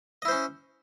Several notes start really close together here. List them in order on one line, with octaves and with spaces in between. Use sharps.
D#5 E4 C5 C#4